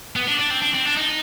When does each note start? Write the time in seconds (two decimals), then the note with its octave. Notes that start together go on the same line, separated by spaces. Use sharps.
0.16 B3
0.27 D4
0.39 D4
0.50 C4
0.62 D4
0.74 C4
0.85 D4
0.97 D#4